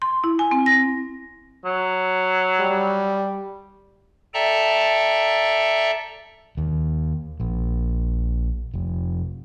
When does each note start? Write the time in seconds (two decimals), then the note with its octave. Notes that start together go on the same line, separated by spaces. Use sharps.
0.02 C6
0.24 E4
0.39 G#5
0.51 C4
0.66 A#6
1.65 F#3
2.60 G3
4.34 A4 D5 E5 G5 A5 A#5
6.57 D#2
7.40 A#1
8.74 F1